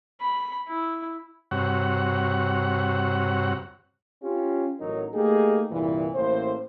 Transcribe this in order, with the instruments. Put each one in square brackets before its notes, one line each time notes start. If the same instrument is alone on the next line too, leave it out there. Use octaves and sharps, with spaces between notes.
[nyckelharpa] B5
E4
[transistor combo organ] G2 C3 F#4 C#5 F#5
[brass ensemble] C#4 F4 G4
A1 F#3 D#4 A#4 C#5
A3 A#3 D#4 G4 G#4
C2 G2 A#2 E3
A1 A2 A#3 C5